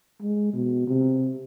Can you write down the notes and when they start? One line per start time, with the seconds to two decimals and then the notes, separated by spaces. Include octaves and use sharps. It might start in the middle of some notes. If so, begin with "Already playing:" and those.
0.22 G#3
0.53 B2
0.87 C3